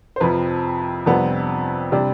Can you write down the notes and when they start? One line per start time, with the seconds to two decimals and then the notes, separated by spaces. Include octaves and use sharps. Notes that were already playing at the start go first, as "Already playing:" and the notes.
0.16 C5
0.20 F2 C3 F3 B4
1.06 F2 C3 G3 B3 D4
1.92 C3 G3 D4